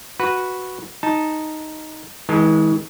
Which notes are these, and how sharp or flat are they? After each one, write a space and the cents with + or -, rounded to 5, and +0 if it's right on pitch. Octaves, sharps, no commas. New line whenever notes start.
F#4 +0 B4 -5
D#4 +0 A5 +0
E3 -45 G#3 +0 A5 +0